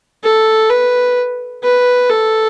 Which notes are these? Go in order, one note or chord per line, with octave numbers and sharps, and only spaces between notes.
A4
B4
B4
A4